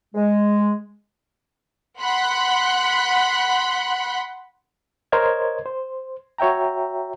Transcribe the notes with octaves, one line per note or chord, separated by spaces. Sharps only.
G#3
F#5 B5 C6 F#6
A#4 C5 C#5 D#5 G#6
C5
F#4 C#5 E5 G5 A#5